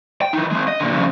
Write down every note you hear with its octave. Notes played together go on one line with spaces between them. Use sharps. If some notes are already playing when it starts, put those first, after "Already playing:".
G5
E3 D#4
G#3 C4
D#5
A#2 D3
F2 C#3